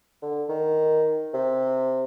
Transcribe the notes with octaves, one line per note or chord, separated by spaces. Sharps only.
D3
D#3
C3